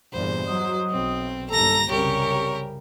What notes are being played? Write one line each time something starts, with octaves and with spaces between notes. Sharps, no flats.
E2 G2 A#2 C5
F#3 D#5
B1 C4
G1 D#2 A4 A#5 A#6
C2 F#2 C#3 G4 A#4 C#5